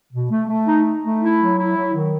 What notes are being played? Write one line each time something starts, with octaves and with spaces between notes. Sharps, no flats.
B2
A3
A3
D#4
D#4
A3
E4
F#3
E4
F#3
D#3